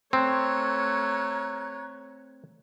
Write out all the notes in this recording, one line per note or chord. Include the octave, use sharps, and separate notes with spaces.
A3 C4 C#5 A#5 F#6 G#6